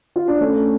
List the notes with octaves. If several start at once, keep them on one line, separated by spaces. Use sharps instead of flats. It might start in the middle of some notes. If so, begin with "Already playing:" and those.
F4
D4
A3 C#4